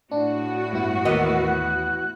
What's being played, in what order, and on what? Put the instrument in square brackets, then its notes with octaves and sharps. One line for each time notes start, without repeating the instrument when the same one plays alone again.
[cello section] A2 F#4 [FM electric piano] D4
[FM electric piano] G2 B3 E4
[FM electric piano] D#2 [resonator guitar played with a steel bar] E3 B3 D#5 [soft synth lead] A#4
[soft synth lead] F#6